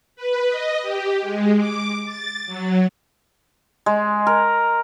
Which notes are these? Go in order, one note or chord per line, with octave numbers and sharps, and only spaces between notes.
B4
D#5
G4
G#3
D6
A6
F#3
G#3
A#4